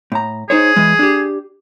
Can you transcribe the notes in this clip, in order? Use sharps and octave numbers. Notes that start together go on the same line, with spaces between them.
A2 A#5
D#4 G#4 C5 C#5
E3 G#3
D4 G4